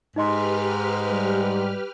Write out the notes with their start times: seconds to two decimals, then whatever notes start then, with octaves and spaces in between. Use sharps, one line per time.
0.16 G#2 D#4 G4 B4 D#5 C6 F6
1.10 G3